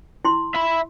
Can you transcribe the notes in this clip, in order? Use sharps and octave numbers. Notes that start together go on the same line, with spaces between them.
E4 C6
E5 B5